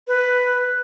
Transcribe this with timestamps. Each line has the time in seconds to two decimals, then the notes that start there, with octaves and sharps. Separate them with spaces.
0.08 B4